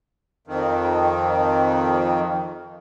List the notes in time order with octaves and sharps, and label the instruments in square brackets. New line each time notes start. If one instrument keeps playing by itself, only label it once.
[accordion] F2 D#3